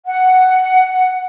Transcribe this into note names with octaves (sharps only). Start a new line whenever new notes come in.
F#5